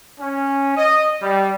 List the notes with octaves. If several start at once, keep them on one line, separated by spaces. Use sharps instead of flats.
C#4
D#5
G3